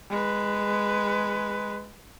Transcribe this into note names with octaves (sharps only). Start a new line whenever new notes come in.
G#3 B4